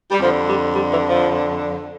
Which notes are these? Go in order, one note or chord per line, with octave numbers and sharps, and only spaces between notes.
G3
F2 D3 F3
G3
G3
E3
F3